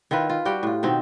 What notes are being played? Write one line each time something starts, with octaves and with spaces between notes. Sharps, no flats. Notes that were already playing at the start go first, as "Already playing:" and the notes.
D#3 E4 F4 B4
F4
G3 F#4 G5
A2 F4
B2 D#3 C4